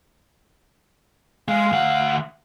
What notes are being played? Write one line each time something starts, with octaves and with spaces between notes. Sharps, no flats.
G#3 F5
D2 F#5